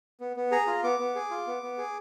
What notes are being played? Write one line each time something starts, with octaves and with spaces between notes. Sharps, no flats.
B3
B3
G#4 A#5
F4
B3 D6
B3
G#4
F4
B3
B3
G#4